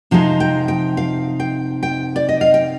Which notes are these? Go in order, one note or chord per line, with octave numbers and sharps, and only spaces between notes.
C3 F3 G#3 D#4 F5
G5
G5
F5
G5
G5
D5
D#5
F5
G5